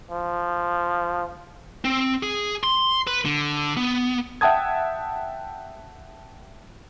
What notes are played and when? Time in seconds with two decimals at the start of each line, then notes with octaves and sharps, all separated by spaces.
0.11 F3
1.85 C4
2.23 G#4
2.64 C6
3.07 B4
3.25 D3
3.77 B3
4.41 E5 F#5 G5 A5 D#6 G#6